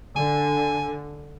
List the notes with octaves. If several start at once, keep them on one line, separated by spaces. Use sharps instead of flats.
D3 G#5